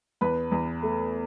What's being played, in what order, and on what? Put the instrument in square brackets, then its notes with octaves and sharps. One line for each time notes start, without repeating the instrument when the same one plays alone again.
[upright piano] E2 B4 B5
E2
A3